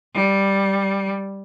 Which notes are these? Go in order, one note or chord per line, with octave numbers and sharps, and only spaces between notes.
G3